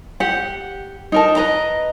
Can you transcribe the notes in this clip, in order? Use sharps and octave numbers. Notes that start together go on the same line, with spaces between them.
G4 F#5
D#4 A#4 A5
B4 D#5 A#5